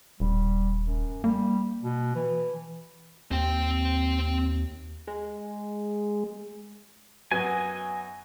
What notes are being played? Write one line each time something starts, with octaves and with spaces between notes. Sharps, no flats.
D#1 G3
F#2
G3 A#3
B2
E3
D#2 C4 G5
G#3
F#2 B3 F#4 D#5 G#5